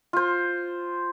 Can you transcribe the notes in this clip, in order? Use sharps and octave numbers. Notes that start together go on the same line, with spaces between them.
F4 C5